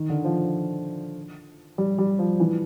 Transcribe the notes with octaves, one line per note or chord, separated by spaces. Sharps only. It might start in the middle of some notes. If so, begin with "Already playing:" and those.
Already playing: D#3
D3
F3
G3
G3
F3
E3